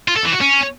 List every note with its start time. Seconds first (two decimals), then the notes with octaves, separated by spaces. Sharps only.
0.08 F4
0.16 A4
0.24 E3
0.33 F#4
0.41 C#4